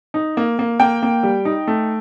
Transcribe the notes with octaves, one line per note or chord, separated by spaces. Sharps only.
D#4
A#3
A#3
A#3 G5
A#3
G3
D#4
A3